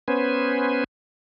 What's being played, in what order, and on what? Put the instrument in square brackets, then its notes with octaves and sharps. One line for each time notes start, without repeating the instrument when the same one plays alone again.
[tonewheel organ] B3 C#4 B4 C5 G#5